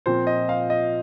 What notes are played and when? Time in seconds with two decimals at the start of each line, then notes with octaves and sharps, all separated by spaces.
0.06 A#2 F3 C4 C5
0.27 D#5
0.49 F5
0.70 D#5